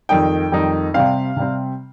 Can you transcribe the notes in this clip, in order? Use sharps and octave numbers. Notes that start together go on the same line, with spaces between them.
F2 D#3 G3 D#4 G5
F2 D#3 G3 D#4
C3 G3 C4 F5
C3 G3 C4